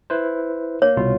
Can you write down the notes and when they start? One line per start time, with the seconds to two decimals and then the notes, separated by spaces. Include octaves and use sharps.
0.10 E4 B4 C5
0.82 A#3 C#5
0.97 C2 B2 F4